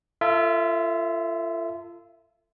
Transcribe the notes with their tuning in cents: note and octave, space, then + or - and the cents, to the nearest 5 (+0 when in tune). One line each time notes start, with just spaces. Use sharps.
F4 -30 A4 +35 E5 +0